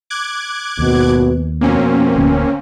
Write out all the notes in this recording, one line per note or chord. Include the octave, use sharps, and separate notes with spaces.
D6 F#6 G#6
G#1 D#2 B2
F2 B2 A#3 C4 C#4
D1 D2